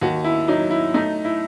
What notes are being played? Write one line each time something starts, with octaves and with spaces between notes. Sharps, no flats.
D#2 F#4
E4
F#3 D#4
E4
A3 D#4
E4